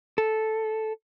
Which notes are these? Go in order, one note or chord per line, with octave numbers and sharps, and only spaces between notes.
A4